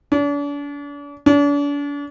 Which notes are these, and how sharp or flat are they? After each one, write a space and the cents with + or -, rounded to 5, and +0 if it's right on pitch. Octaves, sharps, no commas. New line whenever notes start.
D4 -40
D4 -40